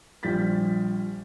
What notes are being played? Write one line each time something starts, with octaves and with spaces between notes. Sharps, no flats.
A#1 G3 F4 G6 A6 B6